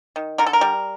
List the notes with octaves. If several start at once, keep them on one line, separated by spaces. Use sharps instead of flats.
D#3
D3 A#4
A4
A#4
G3